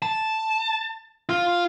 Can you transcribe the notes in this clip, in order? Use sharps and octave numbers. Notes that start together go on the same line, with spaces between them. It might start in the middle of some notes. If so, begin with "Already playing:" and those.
A5
F4